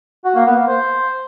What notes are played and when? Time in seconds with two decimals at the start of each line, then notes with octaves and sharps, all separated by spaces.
0.25 F#4
0.35 A#3
0.46 B3
0.57 A#3
0.68 C5